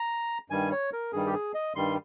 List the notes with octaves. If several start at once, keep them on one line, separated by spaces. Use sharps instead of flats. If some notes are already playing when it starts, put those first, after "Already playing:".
Already playing: A#5
G2 D#3 G3 G#5
C#5
A#4
G2 D#3 G3 G#4
G4
G#4
D#5
G2 D#3 G3 C6